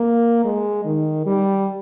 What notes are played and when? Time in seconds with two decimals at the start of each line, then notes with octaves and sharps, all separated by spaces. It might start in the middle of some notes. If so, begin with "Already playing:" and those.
Already playing: A#3
0.44 G#3
0.85 D#3
1.26 G3